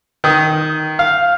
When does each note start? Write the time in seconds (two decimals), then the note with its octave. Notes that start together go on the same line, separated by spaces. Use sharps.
0.24 D#3 D#6
0.99 F5